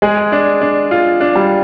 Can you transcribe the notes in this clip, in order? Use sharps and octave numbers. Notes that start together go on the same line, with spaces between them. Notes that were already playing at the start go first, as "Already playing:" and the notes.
G#3 G#4
D4
D4
F4
D4
G3